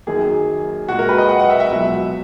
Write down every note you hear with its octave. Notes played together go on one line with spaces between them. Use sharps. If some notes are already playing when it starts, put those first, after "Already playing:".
F#2 D#3 F#3 A#3 G#4
A#2 G#3 F#4
A#4
B4
D#5
F#5
F#5
E5
E5
C#2 B2 F#3